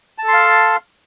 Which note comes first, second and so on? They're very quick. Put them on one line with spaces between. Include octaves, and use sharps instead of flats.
A5 A4 C6 F5